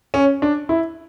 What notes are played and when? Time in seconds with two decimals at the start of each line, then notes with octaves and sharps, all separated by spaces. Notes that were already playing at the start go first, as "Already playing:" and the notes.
0.14 C#4
0.42 D4
0.69 E4